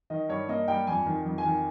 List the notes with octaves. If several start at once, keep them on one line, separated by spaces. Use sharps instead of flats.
D#3 D#5
G2 C#5
A#3 D#5
G2 G5
F2 G#5
D#3
F2
G#5
D#3